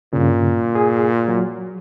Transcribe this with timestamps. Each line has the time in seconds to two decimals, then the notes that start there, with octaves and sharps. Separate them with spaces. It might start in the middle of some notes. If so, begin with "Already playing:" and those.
0.13 G2 A#2 C#3
0.75 G#4
1.28 F#3